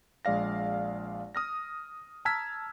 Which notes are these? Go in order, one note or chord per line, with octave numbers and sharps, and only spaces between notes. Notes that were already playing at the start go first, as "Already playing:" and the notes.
A#1 G#3 D5 F5 A#6
D#6 F6 A#6
A5 A#5 E6 F6 G#6 B6